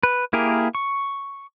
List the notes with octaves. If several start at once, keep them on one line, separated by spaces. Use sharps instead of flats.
B4
A#3 E4 G4 G#4 A#4
C#6